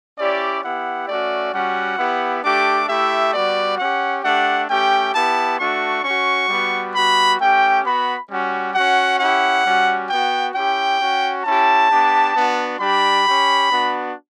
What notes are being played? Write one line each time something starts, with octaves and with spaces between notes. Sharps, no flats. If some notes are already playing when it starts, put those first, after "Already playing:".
C#4 E4 G4 D5
B3 E4 G4 F#5
A3 C#4 F#4 D5
G3 C#4 F#4 F#5
B3 E4 G4
A3 D4 G4 D6
A3 E4 G4 E5
G3 B3 F#4 D5
C#4 G4 F#5
A3 D4 G4 F#5
A3 C#4 G4 G5
B3 E4 G4 A5
A3 D4 F#4 C#6
C#4 F#4 C#6
G3 B3 F#4
G3 B3 F#4 B5
A3 C#4 G4 G5
B3 F#4 B5
G3 C#4 F#4
C#4 F#4 F#5
C#4 E4 G4 F#5
G3 C#4 F#4
B3 F#4 G5
C#4 E4 G4 G5
C#4 F#4
C#4 E4 G4 A5
B3 D4 G4
B3 D4 F#4
G3 D4 G4 B5
C#4 G4
B3 D4 F#4